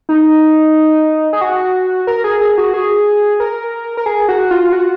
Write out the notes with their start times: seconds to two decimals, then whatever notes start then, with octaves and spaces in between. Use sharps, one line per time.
0.09 D#4
1.33 G#4
1.41 F#4
2.07 A#4
2.24 G#4
2.41 G#4
2.58 F#4
2.74 G#4
3.40 A#4
3.97 A#4
4.06 G#4
4.29 F#4
4.51 F4
4.72 F#4